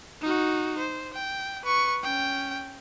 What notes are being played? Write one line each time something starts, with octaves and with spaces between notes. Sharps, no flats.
D#4 F#4
C5
G5
B4 C#6
C#4 G5